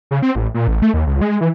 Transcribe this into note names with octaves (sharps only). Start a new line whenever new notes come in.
C#3
C4
A1
A#2
A1
A3
D#2
C#2
G#3
E3